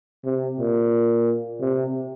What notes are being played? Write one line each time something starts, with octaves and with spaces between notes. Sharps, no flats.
C3
A#2
C3